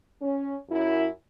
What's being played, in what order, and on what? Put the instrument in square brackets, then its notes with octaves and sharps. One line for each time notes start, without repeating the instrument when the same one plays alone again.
[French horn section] C#4
F#2 E4